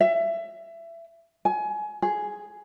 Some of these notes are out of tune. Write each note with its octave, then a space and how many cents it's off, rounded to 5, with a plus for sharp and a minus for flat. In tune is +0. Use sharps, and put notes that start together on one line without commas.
E5 +25
G#5 +25
G#4 +5